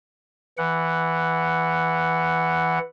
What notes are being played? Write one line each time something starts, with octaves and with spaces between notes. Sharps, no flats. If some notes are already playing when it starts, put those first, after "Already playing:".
E3 F#5